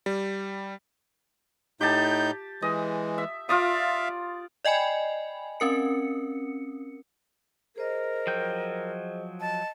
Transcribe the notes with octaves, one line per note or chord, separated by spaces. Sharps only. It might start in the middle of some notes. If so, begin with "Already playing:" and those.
G3
A2 D#4 G4 A5 G6
E3 G#3 D#5
E5
F4 D5 E5 F5 D#6
D5 D#5 G5 G#5 B5
C4 C#4 A#4 C#7
G#4 A#4 C5 D#5
F3 F#3 G5
D#5 A5